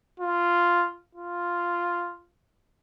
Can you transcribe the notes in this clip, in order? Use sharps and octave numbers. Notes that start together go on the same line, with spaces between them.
F4
F4